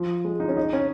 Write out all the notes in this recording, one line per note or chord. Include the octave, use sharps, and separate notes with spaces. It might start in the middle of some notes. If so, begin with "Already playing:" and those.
Already playing: F3
G#3
D#4
C#4
D#4
C#4